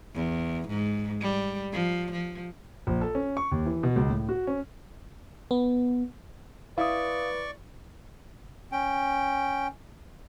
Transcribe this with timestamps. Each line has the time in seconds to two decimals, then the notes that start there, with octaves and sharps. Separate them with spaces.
0.14 E2
0.68 G#2
1.21 G3
1.73 F3
2.11 F3
2.87 A#1
3.01 A4
3.15 C#4
3.37 C#6
3.51 D#2
3.66 E3
3.83 B2
3.96 C#2
4.10 A2
4.29 F#4
4.47 C#4
5.51 B3
6.78 E4 B4 D5 F5 C#6 D#6
8.72 C#4 G5